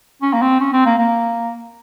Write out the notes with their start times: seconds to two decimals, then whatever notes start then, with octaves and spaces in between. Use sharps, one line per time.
0.22 C#4
0.33 A#3
0.42 C4
0.60 C#4
0.73 C4
0.86 A#3
0.98 A#3